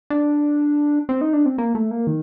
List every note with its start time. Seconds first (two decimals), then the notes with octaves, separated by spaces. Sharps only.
0.10 D4
1.09 C4
1.21 D#4
1.33 D4
1.46 C4
1.58 A#3
1.75 A3
1.91 A#3
2.07 D#3